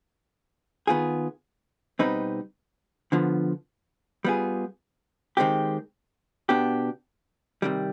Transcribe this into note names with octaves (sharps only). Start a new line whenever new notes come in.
D#3 B3 F4 G#4
B2 G3 C4 D#4 B4
D3 F3 B3
G3 B3 F4 G#4
D#3 G#3 C4 G4
B2 B3 D4 G4
C3 D#3 G3